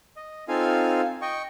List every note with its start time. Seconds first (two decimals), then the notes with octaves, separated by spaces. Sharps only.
0.17 D#5
0.48 C4 D#4 F4 A4 F5 G#5
1.22 D#5 G5 C#6